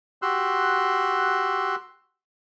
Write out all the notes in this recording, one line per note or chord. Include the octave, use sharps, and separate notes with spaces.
F#4 G4 C6 E6 F#6